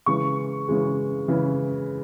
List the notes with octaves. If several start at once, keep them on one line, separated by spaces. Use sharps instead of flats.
C#3 E3 G#3 C#6
C#3 E3 G#3
C#3 E3 G#3